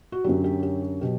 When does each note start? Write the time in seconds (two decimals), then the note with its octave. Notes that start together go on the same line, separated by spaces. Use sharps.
0.12 F#4
0.24 F#2 D3 F#3 G4
0.44 G4
0.63 G4
1.01 B2 F#3 G4